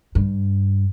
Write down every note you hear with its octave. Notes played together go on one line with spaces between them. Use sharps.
G2